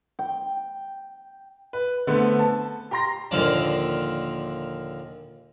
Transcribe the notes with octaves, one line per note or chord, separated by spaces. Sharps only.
G5
B4
D3 A3 B3 C4 B4
A5
G4 G5 A#5 C6 A#6
D#2 A#2 D3 F3 D4